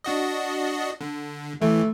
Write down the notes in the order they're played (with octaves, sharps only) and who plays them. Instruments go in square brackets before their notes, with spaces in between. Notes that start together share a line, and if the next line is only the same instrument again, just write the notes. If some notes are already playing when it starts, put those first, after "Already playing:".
[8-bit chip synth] D4 F#4 D#5
D3
[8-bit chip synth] E3 [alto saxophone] A3